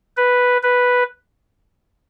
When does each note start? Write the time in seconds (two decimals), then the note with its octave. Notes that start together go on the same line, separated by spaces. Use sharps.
0.17 B4
0.63 B4